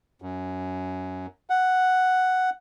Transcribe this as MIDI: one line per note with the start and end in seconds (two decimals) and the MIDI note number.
0.22 1.26 42
1.50 2.50 78